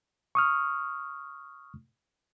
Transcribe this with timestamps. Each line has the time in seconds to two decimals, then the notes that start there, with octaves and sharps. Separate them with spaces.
0.35 C#6 D#6 F6